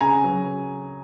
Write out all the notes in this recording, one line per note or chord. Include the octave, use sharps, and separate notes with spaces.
C#3 G#5 A#5
F#3